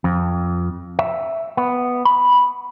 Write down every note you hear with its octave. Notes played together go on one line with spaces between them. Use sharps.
F2
E5
B3
B5